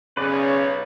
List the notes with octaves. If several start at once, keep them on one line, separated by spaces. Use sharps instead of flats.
B1 C#3 B4 C#5 D5